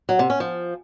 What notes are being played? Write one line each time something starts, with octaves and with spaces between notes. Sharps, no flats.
F#3
C3
C#4
F3